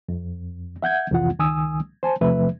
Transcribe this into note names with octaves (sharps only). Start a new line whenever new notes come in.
F2
E5 F#5 G6 G#6
C2 F2 C3 E3 F4 F#5
C#2 D#3 G#5 D#6 E6
C5 G#5 A5
E2 C3 F3 A3 B4 E5